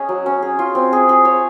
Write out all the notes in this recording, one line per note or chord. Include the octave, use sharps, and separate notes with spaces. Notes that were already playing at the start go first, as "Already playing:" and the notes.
Already playing: C#4 G#4 D#5
F#3
C#4
G#4
F4
C4
G#4
G#4
C#5